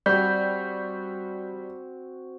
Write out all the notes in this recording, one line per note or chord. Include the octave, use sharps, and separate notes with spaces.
G3 C4 F#4 G6